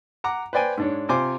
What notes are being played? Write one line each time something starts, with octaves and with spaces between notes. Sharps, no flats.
F#5 A#5 D6
B4 C5 D5 G5 G#5
G#2 D4 C#5
C3 F4 C5 G#5 C6 D6